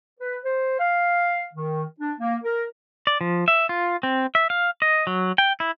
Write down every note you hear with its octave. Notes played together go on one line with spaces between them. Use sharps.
B4
C5
F5
D#3
D4
A#3
A#4
D5
F3
E5
F4
C4
E5
F5
D#5
F#3
G5
E4